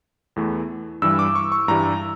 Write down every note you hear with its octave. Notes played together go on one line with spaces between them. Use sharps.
E2 E3 A3
G2 E3 G3 E6
D6
C#6
C#6
G2 E3 G3 A#5